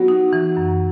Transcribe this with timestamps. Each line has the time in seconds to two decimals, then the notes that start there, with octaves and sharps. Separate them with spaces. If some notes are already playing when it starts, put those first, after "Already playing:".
Already playing: F#3 B3
0.08 D#4
0.33 E3
0.57 F#2